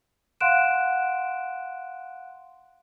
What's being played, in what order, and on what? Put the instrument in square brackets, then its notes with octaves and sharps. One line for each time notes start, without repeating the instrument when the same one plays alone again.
[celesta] F5 F#5 C6 F#6 D7 E7